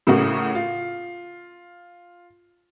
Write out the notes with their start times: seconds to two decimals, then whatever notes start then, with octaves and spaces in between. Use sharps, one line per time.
0.07 A2 C#3 A3 A#3 F#4
0.55 F4